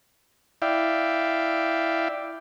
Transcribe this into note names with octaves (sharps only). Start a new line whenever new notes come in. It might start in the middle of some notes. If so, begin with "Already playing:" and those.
E4 D5 E5 F5 G5